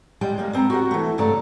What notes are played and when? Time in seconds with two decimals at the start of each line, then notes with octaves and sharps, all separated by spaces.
0.21 G3 G#3 G5
0.38 G3 G#3 A#3
0.53 B3 C4 A5 A#5
0.70 F#4 G4 A#4 F#5
0.91 E3 A3
1.18 G2 C#3 A3 D5 A#5